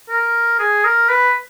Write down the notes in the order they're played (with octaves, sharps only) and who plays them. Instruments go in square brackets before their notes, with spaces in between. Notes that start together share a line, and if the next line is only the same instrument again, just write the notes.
[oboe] A#4
G#4
A#4
B4